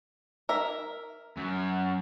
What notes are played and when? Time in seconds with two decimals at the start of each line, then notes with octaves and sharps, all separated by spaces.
0.49 A#4 E5
1.37 F#2